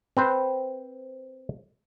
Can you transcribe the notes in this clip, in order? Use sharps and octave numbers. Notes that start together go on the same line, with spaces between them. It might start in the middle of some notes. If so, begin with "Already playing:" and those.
C4 B4 C5